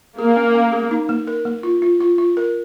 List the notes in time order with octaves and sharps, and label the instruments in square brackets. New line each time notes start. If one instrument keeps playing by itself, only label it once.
[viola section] A#3 [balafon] G#4
[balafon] C#4
C#4
G#4
D#4
A#3
A#4
A#3
F4
F4
F4
F4
A#4